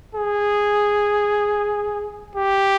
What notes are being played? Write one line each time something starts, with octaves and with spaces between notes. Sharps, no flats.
G#4
G4